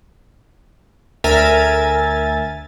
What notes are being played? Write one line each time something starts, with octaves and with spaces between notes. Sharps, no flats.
D2 A#4 E5 G#5 A6